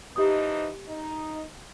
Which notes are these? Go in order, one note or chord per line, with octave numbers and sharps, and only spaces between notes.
E3 F3 D#4 G4 D#6
D#4